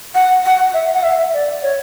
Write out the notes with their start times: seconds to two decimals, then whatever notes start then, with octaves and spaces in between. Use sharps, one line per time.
0.15 F#5
0.45 F#5
0.74 E5
0.94 F#5
1.03 E5
1.19 E5
1.34 D5
1.63 C#5